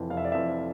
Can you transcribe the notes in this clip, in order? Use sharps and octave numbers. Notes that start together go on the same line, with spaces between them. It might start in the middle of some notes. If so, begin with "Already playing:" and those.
Already playing: F1 F2 E3
F1 F5
E5
D5
F2 E3 E5